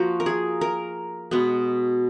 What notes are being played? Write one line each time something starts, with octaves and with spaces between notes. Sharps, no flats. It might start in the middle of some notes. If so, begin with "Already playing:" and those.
Already playing: F3 A#3 F#4
A#4
G#4
A#4
B2 G#3 B3